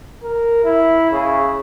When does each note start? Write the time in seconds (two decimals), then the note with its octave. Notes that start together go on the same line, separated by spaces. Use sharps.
0.23 A#4
0.64 E4
1.12 C#3